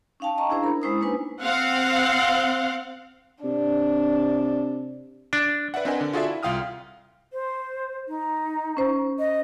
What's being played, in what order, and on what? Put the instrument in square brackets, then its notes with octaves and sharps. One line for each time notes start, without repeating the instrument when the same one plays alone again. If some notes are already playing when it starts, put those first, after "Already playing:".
[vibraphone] C#4 D#4 F5 G5 A5
D#5 F5 A#5 C#6
C#4 D4 E4 G#4 C5 A#5
A#4 B5
G#3 C#4 E4 C5 B5 D#6
A#3 D4 D#4 B4 G#5
[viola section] C4 F5 F#5
[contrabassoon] C3 [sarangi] D4
[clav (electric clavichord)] D4
[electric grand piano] B4 D5 E5 F#5
C4 D4 A#4 B4 D#5 G#5
D3
F4 F#4 G#4 A4 D5 E5
E4
C2 F4 F5 G5 D#6 F6
[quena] C5
D#4
[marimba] C#4 C5
[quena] D#5